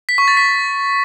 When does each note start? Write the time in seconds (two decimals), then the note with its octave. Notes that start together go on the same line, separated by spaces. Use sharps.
0.09 B6
0.18 C#6
0.28 A6
0.37 B6